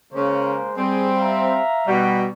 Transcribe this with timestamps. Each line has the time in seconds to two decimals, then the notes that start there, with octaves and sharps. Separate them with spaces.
0.13 C#3 G#3 A#3 C5
0.76 G3 C4 G#4
1.16 E5 F5 A#5
1.87 B2 G3 D#4 F#4